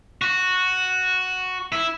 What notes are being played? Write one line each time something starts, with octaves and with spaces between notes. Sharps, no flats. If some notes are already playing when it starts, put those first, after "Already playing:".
F#4
E4